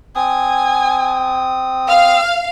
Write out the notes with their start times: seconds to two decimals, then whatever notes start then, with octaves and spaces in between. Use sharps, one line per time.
0.16 C4 G#5 D#6
1.88 F5 F6